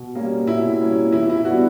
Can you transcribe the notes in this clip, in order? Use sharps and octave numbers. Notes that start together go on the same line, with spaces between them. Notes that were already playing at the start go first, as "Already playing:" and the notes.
Already playing: B2
G3 A#3 C#4
B2 E4
G3 A#3 C#4
E3 E4
E4
G3 B3 D4 F#4